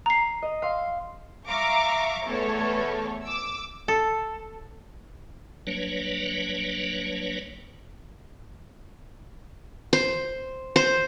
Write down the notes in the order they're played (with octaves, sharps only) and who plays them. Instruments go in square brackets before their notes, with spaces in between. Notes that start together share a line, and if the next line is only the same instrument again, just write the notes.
[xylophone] A#5 C7
[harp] D#5
F5 C6 E6
[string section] E5 F5 A#5 C#6 D6
E2 A3 A4 C#5
D6 E6
[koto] A4
[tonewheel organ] F#3 G3 A#3 D4 B4 C#5
[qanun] C5
C5